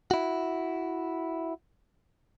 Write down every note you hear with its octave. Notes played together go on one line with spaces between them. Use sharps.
E4 F#4